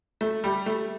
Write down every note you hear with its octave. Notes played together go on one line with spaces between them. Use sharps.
A3
G3
A3